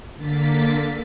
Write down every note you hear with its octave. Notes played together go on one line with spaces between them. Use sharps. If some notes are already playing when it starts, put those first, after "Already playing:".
D3 A#3 A6 B6